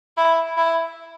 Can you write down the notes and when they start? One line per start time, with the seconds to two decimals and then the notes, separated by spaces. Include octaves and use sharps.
0.17 E4
0.57 E4